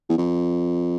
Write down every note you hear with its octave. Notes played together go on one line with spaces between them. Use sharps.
E2
F2